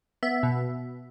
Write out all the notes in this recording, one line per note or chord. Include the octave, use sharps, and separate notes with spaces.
B3 E5
B2